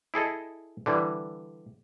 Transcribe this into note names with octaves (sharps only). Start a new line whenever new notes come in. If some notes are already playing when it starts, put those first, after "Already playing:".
E4 G#4 A4 D#5
D3 E3 G3